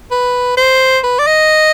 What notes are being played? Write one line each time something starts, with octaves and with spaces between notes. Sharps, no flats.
B4
C5
B4
D5
D#5